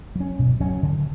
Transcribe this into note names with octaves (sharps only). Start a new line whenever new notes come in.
F#3 C#4
B2
F#3 C#4
D3